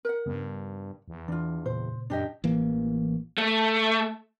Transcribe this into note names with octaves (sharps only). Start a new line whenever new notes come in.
A#4 F#5
G2 C#3 B3
E2
E3 D4 F4
A#2 C#3 C5
F#2 D4 G4 D#5
A1 E3 A#3
A3